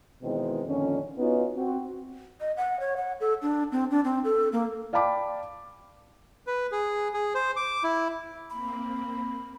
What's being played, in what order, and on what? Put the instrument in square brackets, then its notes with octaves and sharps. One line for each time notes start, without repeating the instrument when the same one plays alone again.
[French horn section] B2 D#3 E3 G#3 C4
F2 A#2 D3 D#3 C#4
B3 C#4 D#4 F4 F#4
C4 F#4
[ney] D#5
F#5
C#5
F#5
A4
D4
C4
D4
C4
A4
A#3
[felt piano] D5 F5 G5 A5 B5 D6
[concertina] B4
G#4
G#4
C5
D6
E4
[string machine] A#3 C4 [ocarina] B5